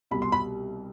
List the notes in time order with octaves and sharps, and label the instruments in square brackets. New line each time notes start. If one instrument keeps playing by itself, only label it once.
[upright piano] C2 B2 B5
C6
B5